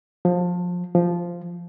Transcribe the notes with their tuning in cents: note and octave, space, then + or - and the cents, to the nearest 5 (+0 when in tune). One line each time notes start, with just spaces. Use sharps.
F3 +25
F3 -5